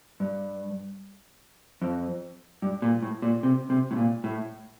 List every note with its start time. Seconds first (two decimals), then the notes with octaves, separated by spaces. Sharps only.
0.20 G2
1.82 F2
2.62 G2
2.82 A#2
3.03 A2
3.22 A#2
3.43 C3
3.70 C3
3.91 A2
3.97 A#2
4.24 A2